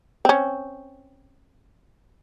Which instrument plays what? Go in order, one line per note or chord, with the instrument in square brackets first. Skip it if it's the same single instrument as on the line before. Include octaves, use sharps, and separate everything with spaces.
[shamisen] C4 C#4